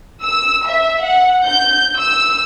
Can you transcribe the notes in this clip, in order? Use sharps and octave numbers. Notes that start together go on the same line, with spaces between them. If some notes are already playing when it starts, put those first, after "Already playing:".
E6
E5
F#5
G6
E6